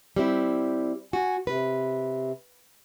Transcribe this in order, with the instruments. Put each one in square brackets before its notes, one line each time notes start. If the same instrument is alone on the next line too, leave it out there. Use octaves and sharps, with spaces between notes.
[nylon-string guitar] G3 C4 E4
[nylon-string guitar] F#4 [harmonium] G#5
[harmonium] C3 [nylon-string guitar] B4